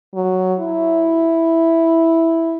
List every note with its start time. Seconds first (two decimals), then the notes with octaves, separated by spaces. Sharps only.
0.15 F#3
0.59 E4